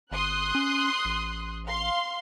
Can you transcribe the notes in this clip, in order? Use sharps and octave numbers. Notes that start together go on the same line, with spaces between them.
G1 C6 D#6 F#6
C#4
A1
F5 C6